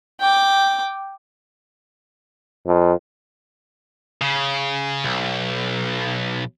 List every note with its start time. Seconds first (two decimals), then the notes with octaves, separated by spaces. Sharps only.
0.20 G5 D6
2.66 F2
4.21 C#3
5.04 B1